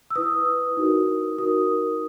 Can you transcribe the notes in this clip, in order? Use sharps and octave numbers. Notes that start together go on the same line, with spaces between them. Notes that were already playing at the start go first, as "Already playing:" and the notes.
E6
E4 B4 D#6
D#4 F#4 A#4
D#4 F#4 A#4 D#6